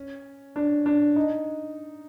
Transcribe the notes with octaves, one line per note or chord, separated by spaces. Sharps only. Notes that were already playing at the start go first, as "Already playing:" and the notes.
Already playing: C#4
D4
D4
D#4